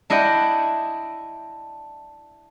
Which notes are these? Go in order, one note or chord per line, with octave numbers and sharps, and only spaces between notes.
D4 E4 D#5 F#5 G5